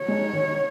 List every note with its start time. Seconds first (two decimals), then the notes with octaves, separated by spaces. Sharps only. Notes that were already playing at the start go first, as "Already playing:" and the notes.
Already playing: C#5
0.08 G#3 D#4
0.33 D#3